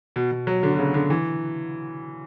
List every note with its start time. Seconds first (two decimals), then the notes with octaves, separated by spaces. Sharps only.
0.16 B2
0.31 B2
0.47 F#3
0.63 D3
0.72 B2
0.79 C#3
0.94 D3
1.10 E3